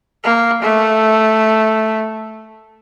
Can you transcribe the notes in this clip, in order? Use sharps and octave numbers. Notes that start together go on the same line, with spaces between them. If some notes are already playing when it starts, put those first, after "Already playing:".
A#3
A3